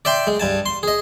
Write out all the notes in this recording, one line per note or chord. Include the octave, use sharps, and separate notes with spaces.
D5 E5 G5 C6
G#3
G2 G#5 A5
C6
G#4 D#5